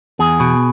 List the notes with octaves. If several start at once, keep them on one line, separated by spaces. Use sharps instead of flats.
E2 G#4
B2